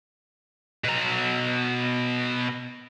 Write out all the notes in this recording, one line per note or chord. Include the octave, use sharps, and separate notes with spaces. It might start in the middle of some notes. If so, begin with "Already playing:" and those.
B2 A#5